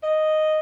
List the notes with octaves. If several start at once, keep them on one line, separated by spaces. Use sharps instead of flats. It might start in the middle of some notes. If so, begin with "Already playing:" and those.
D#5